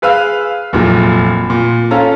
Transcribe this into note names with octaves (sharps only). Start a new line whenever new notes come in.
G#4 B4 F5 E6 F6
F1 A#2 F#3
A#2
C#4 F4 A4 A#5